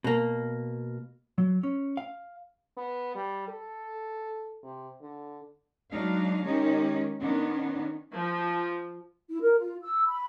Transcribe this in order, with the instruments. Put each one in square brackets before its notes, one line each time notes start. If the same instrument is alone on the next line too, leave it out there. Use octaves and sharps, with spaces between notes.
[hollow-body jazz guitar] B2 A#3
F#3
C#4
F5
[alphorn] B3
G3
A4
C3
D3
[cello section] F#3 G#3 D4 D#4 F5
D#3 G#3 C#4 D#4 G4
D#3 B3 C#4 D4
[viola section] F3
[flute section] E4
A#4
F4
E6
B5